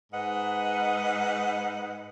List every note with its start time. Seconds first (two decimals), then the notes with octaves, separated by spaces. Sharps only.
0.13 G#2 B4 D#5 F#5